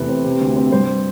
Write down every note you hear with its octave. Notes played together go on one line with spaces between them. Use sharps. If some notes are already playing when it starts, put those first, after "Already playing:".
Already playing: E2 C3 A3 B4
C4
C3
D2
C4
G2 C5